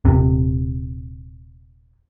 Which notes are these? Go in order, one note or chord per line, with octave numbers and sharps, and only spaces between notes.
D#1 C3